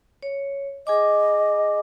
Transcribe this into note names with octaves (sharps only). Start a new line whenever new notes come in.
C#5
G#4 D#5 G#5 D6